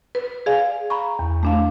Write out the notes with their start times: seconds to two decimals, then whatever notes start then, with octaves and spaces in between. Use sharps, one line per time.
0.15 B4
0.46 G#4 D5 F5 G#5
0.90 F5 A#5 B5 C#6
1.19 E2
1.43 A3 D4 F5